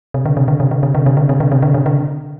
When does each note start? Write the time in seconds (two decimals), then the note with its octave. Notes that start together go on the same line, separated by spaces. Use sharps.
0.14 C3
0.25 D3
0.37 C3
0.48 D3
0.60 C3
0.71 D3
0.83 C3
0.95 D3
1.06 C3
1.17 D3
1.29 C3
1.40 D3
1.52 C3
1.62 D3
1.74 C3
1.86 D3